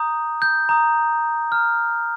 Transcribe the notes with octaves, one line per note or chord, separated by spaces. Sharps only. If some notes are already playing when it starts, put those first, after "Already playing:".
Already playing: A#5 D#6 G6
G6
A#5 D#6 G6
A#5 F6